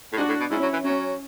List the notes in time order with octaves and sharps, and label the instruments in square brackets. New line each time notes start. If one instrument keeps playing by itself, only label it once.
[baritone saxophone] A2
[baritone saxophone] G#2 [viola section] D4 F#4
[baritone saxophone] A2
B2
[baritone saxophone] G#2 [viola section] C#4 E4
[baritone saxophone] F#3
E3
[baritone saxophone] F#3 [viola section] C#4